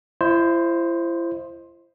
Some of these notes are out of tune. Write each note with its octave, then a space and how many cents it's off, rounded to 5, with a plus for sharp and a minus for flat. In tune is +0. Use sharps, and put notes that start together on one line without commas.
E4 +40 C5 +10 D#5 -5